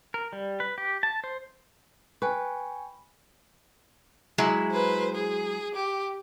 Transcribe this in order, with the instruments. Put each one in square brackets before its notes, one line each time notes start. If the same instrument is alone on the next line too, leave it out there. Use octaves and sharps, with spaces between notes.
[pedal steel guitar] A#4
G3
B4
G4
A5
C5
[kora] B4 [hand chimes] G5 G#5 C#6
[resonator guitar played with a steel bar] F#3 G#3 E4
[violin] B4 C5
G#4
G4